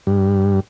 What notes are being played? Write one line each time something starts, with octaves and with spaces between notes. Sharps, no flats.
G2